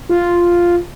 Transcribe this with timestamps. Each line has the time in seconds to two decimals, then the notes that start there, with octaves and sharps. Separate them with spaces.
0.09 F4